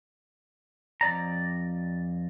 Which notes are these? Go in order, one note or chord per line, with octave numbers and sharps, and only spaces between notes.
F2 D5 A#5